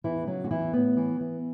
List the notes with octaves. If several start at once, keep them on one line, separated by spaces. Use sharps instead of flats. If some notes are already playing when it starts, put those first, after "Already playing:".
E2 E3 E4
C#3 F#3 F#4
F#4
E2 E3 E4
A2 B3
E3
E3